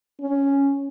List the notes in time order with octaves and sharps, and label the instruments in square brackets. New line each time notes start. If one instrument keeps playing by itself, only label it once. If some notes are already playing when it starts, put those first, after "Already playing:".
[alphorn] C#4